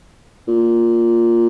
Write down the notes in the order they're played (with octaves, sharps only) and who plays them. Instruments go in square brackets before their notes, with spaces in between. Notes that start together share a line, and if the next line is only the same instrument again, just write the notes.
[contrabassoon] A#2